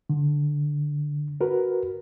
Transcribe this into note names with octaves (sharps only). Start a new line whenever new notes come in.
D3
F#4 A#4 B4